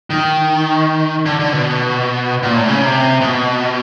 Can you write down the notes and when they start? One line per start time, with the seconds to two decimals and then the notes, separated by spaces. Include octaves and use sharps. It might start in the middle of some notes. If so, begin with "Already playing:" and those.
0.10 D#3
1.26 D3
1.40 D3
1.53 B2
2.43 A#2
2.56 A2
2.68 C#3
2.82 C3
3.21 B2